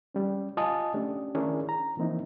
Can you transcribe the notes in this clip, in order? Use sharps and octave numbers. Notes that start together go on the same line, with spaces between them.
G3 C#4
F4 D#5 G#5 A5 D#6
A3 C#4 D4 G4
D#3 C#4 D4 E4 G#4 A#4
A#5
E3 F3 A#3 C4 D#4 E4